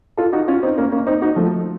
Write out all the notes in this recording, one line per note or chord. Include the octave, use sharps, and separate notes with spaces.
F4 A4
D#4 F#4
C#4 F4
C4 D#4
A#3 C#4
A#3 C#4
C4 D#4
D#4 F#4
F3 A3